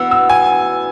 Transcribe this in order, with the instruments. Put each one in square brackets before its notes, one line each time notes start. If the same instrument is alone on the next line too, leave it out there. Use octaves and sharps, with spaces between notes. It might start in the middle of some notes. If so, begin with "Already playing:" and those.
Already playing: [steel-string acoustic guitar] E3 B3 F#4 [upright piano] E6
[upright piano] E6
G#5